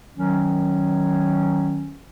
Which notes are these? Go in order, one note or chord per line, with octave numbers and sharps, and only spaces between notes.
D#3 F#3 C#4